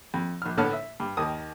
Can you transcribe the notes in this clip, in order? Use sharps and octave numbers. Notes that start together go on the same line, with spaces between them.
F2
A#1 F6
A2 D3 B3 C#5 A5 F6
E5
G2
D#2 D#3 D#6